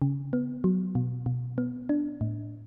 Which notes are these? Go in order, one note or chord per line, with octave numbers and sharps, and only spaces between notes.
C#3
B3
F#3
B2
B2
B3
D4
A2